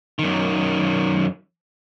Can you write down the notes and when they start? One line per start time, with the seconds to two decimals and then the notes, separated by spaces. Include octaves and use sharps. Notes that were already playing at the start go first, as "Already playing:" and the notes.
0.19 F#2 D#3